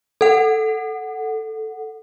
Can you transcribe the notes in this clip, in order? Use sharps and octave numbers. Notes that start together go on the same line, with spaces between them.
A4 F#5